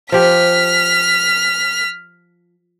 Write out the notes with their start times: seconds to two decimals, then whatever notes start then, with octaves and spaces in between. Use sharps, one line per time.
0.12 F3 G4 F6 B6